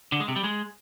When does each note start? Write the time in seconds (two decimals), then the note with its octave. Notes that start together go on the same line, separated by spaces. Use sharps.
0.12 D3
0.20 G#3
0.28 C3
0.36 G3
0.44 G#3